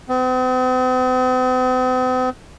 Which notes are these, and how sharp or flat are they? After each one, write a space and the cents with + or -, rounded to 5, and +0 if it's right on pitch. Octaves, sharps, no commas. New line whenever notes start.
C4 -45